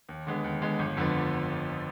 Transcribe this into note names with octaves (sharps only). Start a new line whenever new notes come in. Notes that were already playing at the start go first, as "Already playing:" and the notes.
D#2
D3 G#3 B3
D#2
D3 G#3 B3
G1
F2 D3 F3 B3